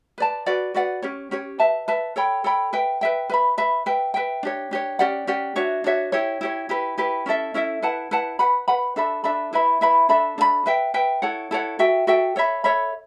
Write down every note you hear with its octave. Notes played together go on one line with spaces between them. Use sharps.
B4 D5 A5
F#4 B4 D5 F#5
F#4 B4 D5 F#5
C#4 G4 C#5
C#4 G4 C#5
B4 E5 A5
B4 E5 A5
A4 C#5 G5 B5
A4 C#5 G5 B5
B4 E5 G5
B4 E5 G5
B4 E5 B5
B4 E5 B5
B4 E5 G5
B4 E5 G5
D4 G4 C#5
D4 G4 C#5
C#4 G4 D5 F#5
C#4 G4 D5 F#5
D4 F#4 C#5 E5
D4 F#4 C#5 E5
E4 G4 C#5
E4 G4 C#5
E4 G4 B4
E4 G4 B4
C#4 E4 A4 E5
C#4 E4 A4 E5
E4 B4 F#5 A5
E4 B4 F#5 A5
B4 F#5 B5
B4 F#5 B5
D4 A4 E5 B5
D4 A4 E5 B5
E4 B4 E5 B5
E4 B4 E5 B5
D4 A4 E5 B5
D4 A4 E5 B5
B4 E5 G5
B4 E5 G5
E4 A4 C#5 F#5
E4 A4 C#5 F#5
F#4 A4 E5 G5
F#4 A4 E5 G5
A4 C#5 E5 B5
A4 C#5 E5 B5